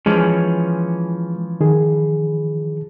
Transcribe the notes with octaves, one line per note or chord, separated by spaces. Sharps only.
E3 F3 G#3 C#4
D#3 G#4